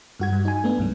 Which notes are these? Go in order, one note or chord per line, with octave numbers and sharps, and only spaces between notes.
G2 F#4 G#6
G2
D#4 G#5
A3 B3 D4
C2 G#2 F#3